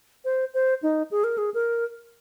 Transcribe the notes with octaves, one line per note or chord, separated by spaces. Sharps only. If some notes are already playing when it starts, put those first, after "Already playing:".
C5
C5
D#4
G#4
A#4
G#4
A#4